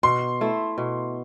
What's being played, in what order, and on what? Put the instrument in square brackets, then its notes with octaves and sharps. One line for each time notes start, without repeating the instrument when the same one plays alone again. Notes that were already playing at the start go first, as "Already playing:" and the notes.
[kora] B2 [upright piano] C6
[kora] A3 E4
B2